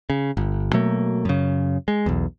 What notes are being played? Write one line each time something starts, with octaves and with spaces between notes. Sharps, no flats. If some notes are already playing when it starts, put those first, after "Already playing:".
C#3
G1
B2 F#3 A3 A#3
F#2 C#3
G#3
B1 E2